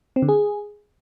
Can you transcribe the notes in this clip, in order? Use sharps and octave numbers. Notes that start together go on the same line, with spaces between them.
C4
D3
G#4